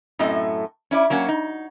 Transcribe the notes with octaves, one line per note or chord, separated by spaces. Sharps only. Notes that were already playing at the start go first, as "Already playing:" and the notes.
F#2 A2 A3 C4 D#5
C#4 E4 D5
F#3 A#3 C#4 F#4
D#4